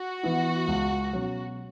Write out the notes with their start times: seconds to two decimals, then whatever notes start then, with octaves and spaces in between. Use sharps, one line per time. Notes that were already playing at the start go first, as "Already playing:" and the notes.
Already playing: F#4
0.23 E3 B3 E4
0.67 C#2
1.13 B2 F#3 C#4